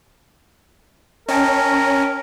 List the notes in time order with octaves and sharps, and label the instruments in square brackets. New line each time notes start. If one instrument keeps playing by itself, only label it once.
[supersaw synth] C#4 [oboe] A#4 [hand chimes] D#5 G5 A5